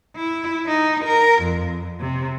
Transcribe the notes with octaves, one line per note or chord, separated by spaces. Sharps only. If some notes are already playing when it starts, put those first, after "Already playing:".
E4
D#4
A#4
F2
C3